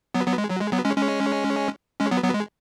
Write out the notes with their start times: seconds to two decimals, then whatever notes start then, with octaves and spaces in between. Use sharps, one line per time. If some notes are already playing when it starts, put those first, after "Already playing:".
0.14 F#3 B3
0.27 F#3 B3
0.38 G#3
0.50 F#3
0.61 G#3
0.72 F#3 B3
0.84 G#3 C#4
0.96 G#3 C#4
2.00 G#3 C#4
2.11 F#3 B3
2.23 F#3 B3
2.34 G#3